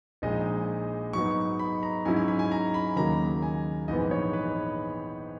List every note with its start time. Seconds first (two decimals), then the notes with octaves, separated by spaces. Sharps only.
0.22 A#1 A#2 G#3 D#4 D#5
1.13 G#2 F#3 B3 D#4 C#6
1.59 B5
1.83 A#5
2.05 G#2 F#3 C#4 E4 G#5
2.16 G#5
2.28 B5
2.39 G#5
2.51 A#5
2.74 B5
2.96 D#2 C#3 F#3 A#3 D#4 A#5
3.43 G#5
3.88 A#1 G#2 E3 B3 D#5
4.11 C#5
4.33 B4